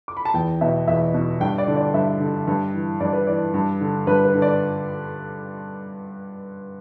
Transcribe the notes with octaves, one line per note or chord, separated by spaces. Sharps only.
D6
B5
A5
E2 G5
B2 E5
E2 E5
B2
G2 G5
D5
D3
D5
G2 E5
D3
G2
E3
G2 D5
B4
E3 D5
G2
D3
G2 B4
B4
D3
D5